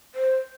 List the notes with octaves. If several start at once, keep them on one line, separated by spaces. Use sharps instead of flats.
C5